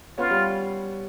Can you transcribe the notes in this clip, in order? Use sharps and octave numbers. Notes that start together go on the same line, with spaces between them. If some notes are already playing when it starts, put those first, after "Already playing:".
B3 C#4 F4
G3